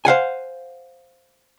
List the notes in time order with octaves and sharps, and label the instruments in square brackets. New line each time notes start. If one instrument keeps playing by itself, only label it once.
[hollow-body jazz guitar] C5 F5 F#5 G#5